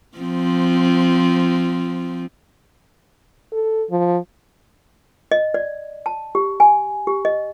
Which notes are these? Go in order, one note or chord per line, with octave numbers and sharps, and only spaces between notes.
F3 C4
A4
F3
D#5
D5
A5
G4
G#5
G4
D#5